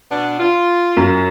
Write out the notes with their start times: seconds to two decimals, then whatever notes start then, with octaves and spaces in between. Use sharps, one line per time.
0.10 B2 B3 D4
0.39 F4
0.97 F#2